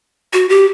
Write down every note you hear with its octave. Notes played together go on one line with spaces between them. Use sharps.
F#4
G4